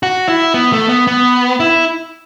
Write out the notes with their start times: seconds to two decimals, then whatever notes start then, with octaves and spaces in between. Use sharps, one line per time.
0.03 F#4
0.28 E4
0.54 B3
0.73 A3
0.89 B3
1.07 B3
1.60 E4